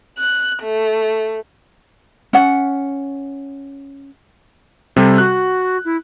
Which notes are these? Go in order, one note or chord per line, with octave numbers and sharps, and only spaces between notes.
F#6
A3
C#4 F#5
C3 G3 A4
F#4 F#6
E4